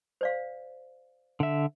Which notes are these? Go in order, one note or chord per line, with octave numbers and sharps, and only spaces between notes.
C5 D5 F5
D3 E5